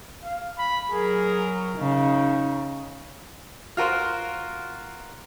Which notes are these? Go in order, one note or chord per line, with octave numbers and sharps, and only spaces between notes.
F5
B5
F#3 G#4 A#4
C#3 D#4
F4 F#4 A#4 C5